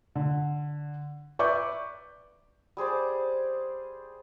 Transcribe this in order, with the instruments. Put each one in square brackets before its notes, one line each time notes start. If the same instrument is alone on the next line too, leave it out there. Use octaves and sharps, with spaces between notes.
[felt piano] D3
B4 D5 E5 C#6 D6 G6
[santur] G3 G#4 C5 D5